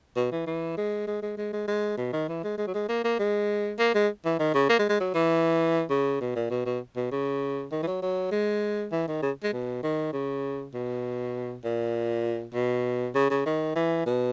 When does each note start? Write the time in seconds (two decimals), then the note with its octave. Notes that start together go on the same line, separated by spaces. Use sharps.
0.16 B2
0.32 E3
0.47 E3
0.77 G#3
1.07 G#3
1.22 G#3
1.37 G#3
1.53 G#3
1.68 G#3
1.98 B2
2.13 D#3
2.29 E3
2.44 G#3
2.58 G#3
2.67 F#3
2.74 G#3
2.89 A#3
3.04 A#3
3.19 G#3
3.79 A#3
3.95 G#3
4.25 E3
4.39 D#3
4.54 C#3
4.69 A#3
4.79 G#3
4.89 G#3
5.01 F#3
5.14 E3
5.90 C#3
6.21 B2
6.36 A#2
6.50 B2
6.66 B2
6.96 B2
7.12 C#3
7.72 D#3
7.83 E3
7.87 F#3
8.02 F#3
8.32 G#3
8.92 E3
9.08 D#3
9.22 C#3
9.43 G#3
9.53 B2
9.83 D#3
10.13 C#3
10.74 B2
11.64 A#2
12.54 B2
13.15 C#3
13.31 C#3
13.46 D#3
13.76 E3
14.06 B2